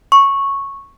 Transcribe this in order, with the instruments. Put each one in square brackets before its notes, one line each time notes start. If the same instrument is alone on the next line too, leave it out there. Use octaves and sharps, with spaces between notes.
[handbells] C#6